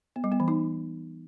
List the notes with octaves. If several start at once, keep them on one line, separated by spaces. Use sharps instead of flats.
B3
G3
B3
E3
D#4